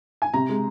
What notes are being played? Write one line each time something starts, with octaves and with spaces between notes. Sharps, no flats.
G#5
C3 A#5
G#3